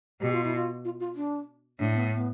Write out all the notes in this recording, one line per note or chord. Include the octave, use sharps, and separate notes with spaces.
B2 G4
F4
E4
F4
F4
F4
D4
A2 D4
B3
B3